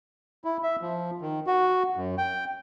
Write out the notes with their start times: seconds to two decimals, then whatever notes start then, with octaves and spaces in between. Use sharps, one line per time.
0.44 E4
0.63 E5
0.81 F3
1.22 D#3
1.47 F#4
1.96 F#2
2.18 G5